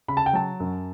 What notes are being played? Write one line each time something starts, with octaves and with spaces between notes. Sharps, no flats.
C#3 B5
A5
G5
F#3 A5
F#2